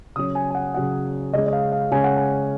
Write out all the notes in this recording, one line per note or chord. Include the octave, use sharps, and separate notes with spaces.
C#3 F#3 C#4 D#6
G#5
G#5
F#5
C#3 F#3 C#4 F#5
C#3 G#3 C#4 D#5
D#5
F5
F5
C#3 G#3 C#4 G#5
F#5
G#5